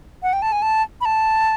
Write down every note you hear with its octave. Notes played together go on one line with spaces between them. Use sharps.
F#5
G5
A5
G#5
A5
B5
A5